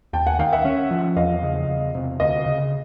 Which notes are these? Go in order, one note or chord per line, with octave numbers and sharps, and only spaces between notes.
D#2 G5 A5
F#5 G#5
D#3 F5 G5
E5 F#5
C#4
F3
E2 D#5 F5
C#3
E2
C3
D2 D#5 F5
C#3